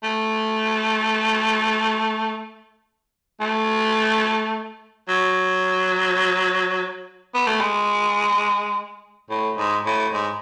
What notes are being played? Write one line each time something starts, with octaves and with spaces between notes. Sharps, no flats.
A3
A3
F#3
B3
A3
G#3
A2
G#2
A2
G#2